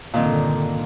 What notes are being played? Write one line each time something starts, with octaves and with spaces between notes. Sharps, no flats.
G2 A#2 D3 D#3 C4